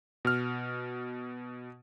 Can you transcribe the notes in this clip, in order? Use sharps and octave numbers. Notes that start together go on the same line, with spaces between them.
B2 F6